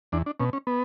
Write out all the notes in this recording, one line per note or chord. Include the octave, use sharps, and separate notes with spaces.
E2 D4
D4
B2 C#4
C#4
B3